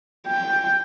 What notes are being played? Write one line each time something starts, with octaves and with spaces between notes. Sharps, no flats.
G5